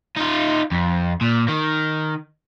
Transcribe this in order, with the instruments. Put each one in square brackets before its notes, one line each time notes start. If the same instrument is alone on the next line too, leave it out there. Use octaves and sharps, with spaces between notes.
[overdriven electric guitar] D#4 F4
F2
A#2
D#3